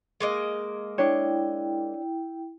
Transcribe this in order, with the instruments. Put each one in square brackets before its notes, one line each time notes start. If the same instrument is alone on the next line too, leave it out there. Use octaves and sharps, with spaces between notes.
[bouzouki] G#3 A#3 D#5
[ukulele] D4 C#5 [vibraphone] E4 G5